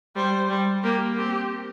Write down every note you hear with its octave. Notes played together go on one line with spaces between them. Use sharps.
G3 C5
G3
A#3 G4
C4 G4